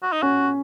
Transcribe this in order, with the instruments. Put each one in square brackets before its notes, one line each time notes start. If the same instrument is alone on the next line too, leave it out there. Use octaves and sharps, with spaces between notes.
[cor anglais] F#4
D#4
[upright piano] C#4 [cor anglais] F#4